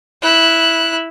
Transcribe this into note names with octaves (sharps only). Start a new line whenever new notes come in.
E4 F#6